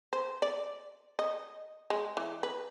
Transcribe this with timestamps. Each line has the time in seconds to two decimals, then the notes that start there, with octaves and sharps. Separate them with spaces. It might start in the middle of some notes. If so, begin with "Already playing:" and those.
0.13 C5
0.42 D5
1.19 D#5
1.90 G#3
2.17 E3
2.43 B4